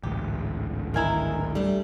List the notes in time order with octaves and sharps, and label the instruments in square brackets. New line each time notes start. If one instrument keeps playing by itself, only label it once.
[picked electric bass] A1 D2 G#2 [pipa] G4
[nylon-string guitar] D#3 E4 [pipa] A#4 G#5 A#5
[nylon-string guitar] G3 A3 D4